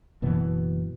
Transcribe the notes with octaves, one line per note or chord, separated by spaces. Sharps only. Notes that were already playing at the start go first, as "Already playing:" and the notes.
F#1 B2 E3 B3